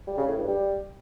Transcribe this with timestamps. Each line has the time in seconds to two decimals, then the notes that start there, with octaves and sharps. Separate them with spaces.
0.07 G3
0.17 C#3
0.28 A2
0.38 G2
0.48 G3